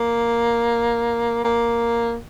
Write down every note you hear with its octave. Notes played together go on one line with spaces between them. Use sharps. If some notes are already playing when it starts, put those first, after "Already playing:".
Already playing: A#3
A#3